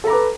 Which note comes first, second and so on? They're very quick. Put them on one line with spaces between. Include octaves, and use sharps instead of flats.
A4 A#5 D6 B4